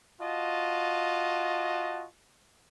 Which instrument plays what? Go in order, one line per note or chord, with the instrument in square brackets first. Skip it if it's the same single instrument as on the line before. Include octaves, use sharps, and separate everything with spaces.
[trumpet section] F4 F#4 D#5 A5